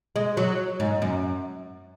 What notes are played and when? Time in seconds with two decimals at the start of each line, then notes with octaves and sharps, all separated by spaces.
0.16 G#3
0.37 F#3
0.80 G#2
1.02 F#2